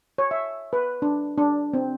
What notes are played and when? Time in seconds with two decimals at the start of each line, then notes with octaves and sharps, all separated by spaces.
0.18 C#5
0.31 E5
0.73 B4
1.02 D4
1.38 D4
1.74 C4